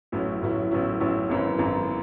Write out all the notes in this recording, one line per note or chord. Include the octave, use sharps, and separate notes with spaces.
A1 A2 F#3 C#4 E4
A1 A2 F#3 C#4 E4
A1 A2 F#3 C#4 E4
A1 A2 F#3 C#4 E4
G#1 F#2 E3
G#1 F#2 E3